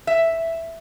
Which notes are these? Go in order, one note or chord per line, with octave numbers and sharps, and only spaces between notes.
E5